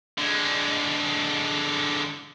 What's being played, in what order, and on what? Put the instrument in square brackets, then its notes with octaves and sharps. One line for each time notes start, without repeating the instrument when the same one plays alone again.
[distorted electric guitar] D3 G#3